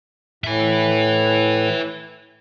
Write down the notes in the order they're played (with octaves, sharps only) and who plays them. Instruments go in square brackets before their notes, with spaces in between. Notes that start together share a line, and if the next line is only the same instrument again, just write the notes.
[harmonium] A2 [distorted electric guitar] B4 E5